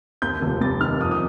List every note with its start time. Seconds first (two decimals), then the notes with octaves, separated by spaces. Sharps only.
0.22 D#2 G6
0.42 F1
0.61 G3 A6
0.81 D#3 F6
1.00 F2 D#6
1.11 D#6